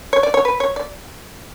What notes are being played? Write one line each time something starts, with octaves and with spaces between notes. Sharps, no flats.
C#5
D5
C#5
B4
C#5
D5